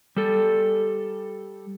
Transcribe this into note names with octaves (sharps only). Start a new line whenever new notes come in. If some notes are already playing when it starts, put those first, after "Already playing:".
G3 A4